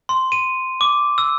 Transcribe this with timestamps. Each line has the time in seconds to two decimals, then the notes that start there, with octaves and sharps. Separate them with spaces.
0.09 C6
0.32 D#7
0.81 D6
1.18 E6